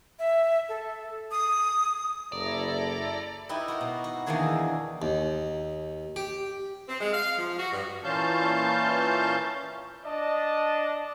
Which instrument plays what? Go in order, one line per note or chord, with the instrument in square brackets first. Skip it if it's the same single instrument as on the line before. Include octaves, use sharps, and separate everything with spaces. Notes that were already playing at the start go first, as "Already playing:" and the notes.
[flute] E5
A4
D#6
[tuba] F#1 [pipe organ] E4 A4 A#5 [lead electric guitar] D5
[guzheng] D#4 E4 G4 B4
F#4 A#4
B2
F#4
E2 D#3 E3 A#3 D4 G#4
[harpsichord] D#2
G4
[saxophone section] C4
G#3
F5
F3
F#4
G2
[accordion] A#2 E3 C#4 F5 A5 G6
[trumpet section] D4 D5 D#5 A5